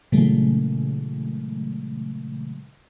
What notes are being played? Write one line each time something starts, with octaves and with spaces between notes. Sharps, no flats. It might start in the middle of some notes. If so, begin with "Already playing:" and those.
A#2 C#3 E3 F#3 G#3 A3